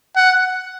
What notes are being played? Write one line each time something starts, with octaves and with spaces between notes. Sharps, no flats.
F#5